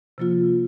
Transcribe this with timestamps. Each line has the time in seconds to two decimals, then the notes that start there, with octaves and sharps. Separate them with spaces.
0.18 C3 F3 A#3 F4